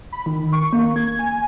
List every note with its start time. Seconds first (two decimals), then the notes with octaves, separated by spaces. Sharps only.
0.12 B5
0.26 D#3
0.52 C#6
0.73 A#3
0.96 G#6
1.19 G#5